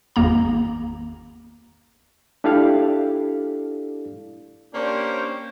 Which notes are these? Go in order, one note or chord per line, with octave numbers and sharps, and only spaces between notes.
G#1 E2 A#3 A#5
D4 E4 G4 A4 D5 F5
A#3 C#4 D4 G4 C5